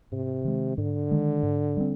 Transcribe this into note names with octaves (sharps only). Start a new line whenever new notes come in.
G#2 C3
D#3 G#3
G#2 D3
D#3 G#3
G#2
G3 C4